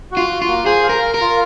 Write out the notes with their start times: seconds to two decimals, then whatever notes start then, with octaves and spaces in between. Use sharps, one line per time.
0.11 F#4
0.17 F4
0.30 F#4
0.42 F4
0.47 A#3
0.65 G#4 C5
0.84 F5
0.89 A#4
1.02 F5
1.14 A#4
1.21 F4